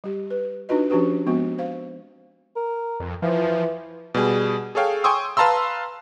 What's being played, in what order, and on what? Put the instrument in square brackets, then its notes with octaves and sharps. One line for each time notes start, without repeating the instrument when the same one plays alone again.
[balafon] G3 G4
B4
D4 D#4 F4 F#4 B4 D#5
F3 C#4 D4 F#4 G4 B4
F3 G#3 B3 C4 F#4
C5 F5
[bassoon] A#4
[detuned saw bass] F2
[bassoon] E3 [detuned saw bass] F3
[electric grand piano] B2 G3 G#4
G#4 A4 C#5 F5 G5
G5 G#5 C6 C#6 D#6 E6
B4 F5 A5 A#5 C6 E6